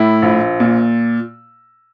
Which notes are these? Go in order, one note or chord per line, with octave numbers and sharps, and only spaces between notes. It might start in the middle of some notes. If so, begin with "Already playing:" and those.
Already playing: A2 E4
A#1
A#2